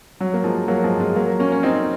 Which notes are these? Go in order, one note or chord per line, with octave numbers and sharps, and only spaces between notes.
F#3
A#3
F3 G#3
F#3 A#3
F3 G#3
F3 G#3
F#3 A#3
A#3 C#4
C#4
C4 D#4